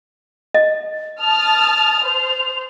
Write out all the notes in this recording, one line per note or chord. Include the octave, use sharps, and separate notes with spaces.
D#5
A5 D#6 F6 F7
C5